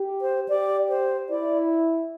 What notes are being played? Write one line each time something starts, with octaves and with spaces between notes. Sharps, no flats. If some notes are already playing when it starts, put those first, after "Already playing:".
Already playing: G4
C5
G4 D5
C5
E4 D5